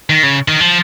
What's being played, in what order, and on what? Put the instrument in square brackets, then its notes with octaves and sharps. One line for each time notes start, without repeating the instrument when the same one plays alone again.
[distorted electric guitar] D#3
C#3
D#3
F3